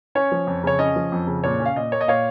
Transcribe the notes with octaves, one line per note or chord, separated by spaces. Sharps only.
C#4 C#5
F3
F2
C#3 C#5
C#4 D#5
F3
F2
C#3
A#2 C#5
C#4
F5
A#2 D#5
A#3 C#5
D#5
A#2 C#5 F5